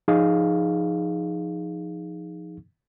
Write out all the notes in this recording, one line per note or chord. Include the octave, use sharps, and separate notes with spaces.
F3 D#4 G#4 F5